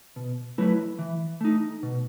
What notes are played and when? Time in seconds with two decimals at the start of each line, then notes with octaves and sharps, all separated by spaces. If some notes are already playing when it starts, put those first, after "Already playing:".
0.16 B2
0.58 F#3 A3 E4 B4
0.99 E3
1.41 A3 D#4
1.83 B2